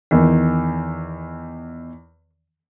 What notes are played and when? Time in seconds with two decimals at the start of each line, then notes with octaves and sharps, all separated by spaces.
0.11 E2 D#3